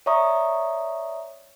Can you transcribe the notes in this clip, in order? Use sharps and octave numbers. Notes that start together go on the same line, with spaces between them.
C#5 D5 E5 A#5 C#6 D#6